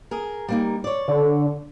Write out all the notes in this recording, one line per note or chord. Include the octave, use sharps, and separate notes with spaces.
G#4 A#4
G3 A#3 D#4
C#5 D5
D3